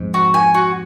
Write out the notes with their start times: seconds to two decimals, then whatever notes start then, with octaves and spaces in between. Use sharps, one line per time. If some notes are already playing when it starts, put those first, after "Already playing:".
Already playing: F2 G#2
0.14 F#4
0.34 G#5
0.54 F#4